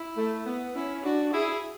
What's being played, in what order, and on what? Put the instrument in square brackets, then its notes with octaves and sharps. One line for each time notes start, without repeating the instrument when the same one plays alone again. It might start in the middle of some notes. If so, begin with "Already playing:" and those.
Already playing: [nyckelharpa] E4
[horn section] A3
B3
[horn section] C#4 [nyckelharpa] E4
[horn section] D4 [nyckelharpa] F#4
[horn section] E4 [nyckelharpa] G#4